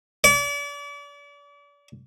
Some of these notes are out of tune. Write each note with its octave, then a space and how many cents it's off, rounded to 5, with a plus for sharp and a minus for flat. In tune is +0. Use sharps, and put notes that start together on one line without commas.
D5 -40